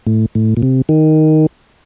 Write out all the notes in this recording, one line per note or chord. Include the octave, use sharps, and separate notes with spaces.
A2
A2
A#2
C3
D#3